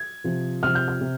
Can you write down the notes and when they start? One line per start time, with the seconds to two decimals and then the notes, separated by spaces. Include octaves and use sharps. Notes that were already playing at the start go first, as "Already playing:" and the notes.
Already playing: G#6
0.24 C3 F3
0.63 C3 F3 F6
0.75 G6
0.88 F6
1.01 C3